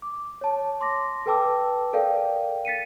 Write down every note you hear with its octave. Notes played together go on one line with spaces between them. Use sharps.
D6
C#5 A5
C6 D6 A#6
A4 B4 G5 A5 D6 E6
A4 A#4 D5 F5 G5
A6 B6 C#7 D#7